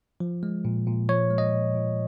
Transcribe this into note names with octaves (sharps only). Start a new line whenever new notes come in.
F3
G#3
A#2
A#2
F3 C#5
G#3
D#5
A#2
A#2